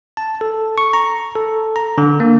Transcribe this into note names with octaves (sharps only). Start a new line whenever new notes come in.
A5
A4
C#6
A#5
A4
A#5
D3
A#3